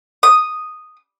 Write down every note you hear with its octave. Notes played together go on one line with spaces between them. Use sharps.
D#6